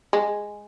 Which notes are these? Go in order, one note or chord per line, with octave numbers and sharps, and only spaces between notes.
G#3